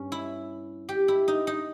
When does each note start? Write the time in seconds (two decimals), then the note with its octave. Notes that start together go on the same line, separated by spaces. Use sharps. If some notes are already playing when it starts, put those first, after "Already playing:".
Already playing: G2 C#4
0.12 E4
0.89 G4
1.08 E4
1.28 D#4
1.47 D#4